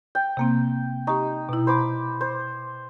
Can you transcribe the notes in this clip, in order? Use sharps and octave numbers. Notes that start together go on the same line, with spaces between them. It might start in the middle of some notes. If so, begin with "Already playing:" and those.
G5
C3 A#3 C4
D#4 G4 C#6
B2 E4
C5 B5 D6
C5